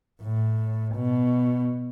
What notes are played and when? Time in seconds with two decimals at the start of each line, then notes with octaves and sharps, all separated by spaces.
0.22 A2
0.96 B2